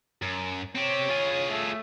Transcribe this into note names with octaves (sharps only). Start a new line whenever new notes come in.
F#2
C4 G4 C#5
F4 G#4
A3